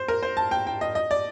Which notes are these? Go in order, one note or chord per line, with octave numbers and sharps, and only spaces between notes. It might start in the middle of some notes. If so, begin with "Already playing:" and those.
Already playing: C5
A#4
C5
A5
G5
G5
D#5
D#5
D5